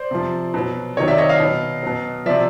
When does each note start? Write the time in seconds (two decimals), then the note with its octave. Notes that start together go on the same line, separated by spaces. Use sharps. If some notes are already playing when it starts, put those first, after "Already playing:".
Already playing: C5 D5
0.11 C3 F3
0.54 B2 F#3
0.97 C3 D#3 F#3 C#5 D#5
1.07 D5 E5
1.18 C#5 D#5
1.29 D#5 F5
1.40 B2 F#3
1.83 B2 F#3
2.26 C3 F3 D5 E5